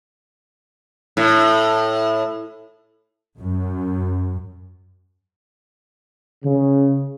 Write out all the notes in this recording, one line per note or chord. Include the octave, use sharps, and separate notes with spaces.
A2
F#2
C#3